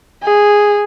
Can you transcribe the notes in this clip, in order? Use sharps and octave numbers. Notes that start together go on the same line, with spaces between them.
G#4